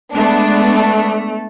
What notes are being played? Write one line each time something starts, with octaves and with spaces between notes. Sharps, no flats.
G#3 A3 B3 D4